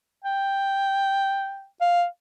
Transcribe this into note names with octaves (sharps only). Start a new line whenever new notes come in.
G5
F5